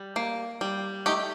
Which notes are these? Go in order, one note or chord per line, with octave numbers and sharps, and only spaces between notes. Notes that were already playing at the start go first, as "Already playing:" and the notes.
Already playing: G3
A#3
G3
A3 D#4 G4